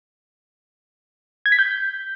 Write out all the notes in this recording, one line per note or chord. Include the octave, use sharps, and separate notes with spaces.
G#6
B6
G6